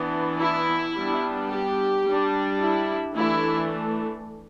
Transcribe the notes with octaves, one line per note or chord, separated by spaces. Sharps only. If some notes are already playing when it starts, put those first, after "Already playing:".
Already playing: E3 B3 D4
E4
G3 B3 D4
G4
G3 D4
E4
E3 A3 D4 E4